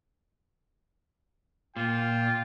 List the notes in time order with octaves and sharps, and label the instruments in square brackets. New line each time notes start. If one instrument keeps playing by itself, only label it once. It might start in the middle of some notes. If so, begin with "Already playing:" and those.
[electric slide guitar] A#2 [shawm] F4 [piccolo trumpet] G5